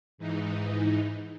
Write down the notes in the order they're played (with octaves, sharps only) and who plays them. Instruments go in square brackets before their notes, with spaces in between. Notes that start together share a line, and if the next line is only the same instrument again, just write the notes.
[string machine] G#2 E3 D#4